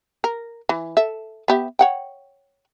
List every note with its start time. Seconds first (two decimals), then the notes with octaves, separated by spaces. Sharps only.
0.24 A#4
0.69 E3
0.97 A4 E5
1.48 B3 G4 E5
1.79 C#5 F#5 G5